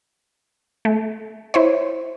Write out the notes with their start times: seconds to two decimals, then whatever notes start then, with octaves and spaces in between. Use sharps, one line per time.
0.85 A3
1.54 E4 C5 C#5